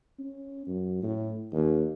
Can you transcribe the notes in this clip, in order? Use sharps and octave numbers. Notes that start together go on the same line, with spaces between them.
C#4
F#2
A2
D#2